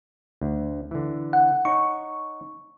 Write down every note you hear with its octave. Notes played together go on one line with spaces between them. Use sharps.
D2
D3 E3
F#5
D#4 C#5 F#5 C#6